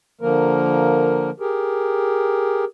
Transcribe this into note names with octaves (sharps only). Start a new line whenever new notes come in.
D3 F3 A#3 A#4
G4 G#4 A#4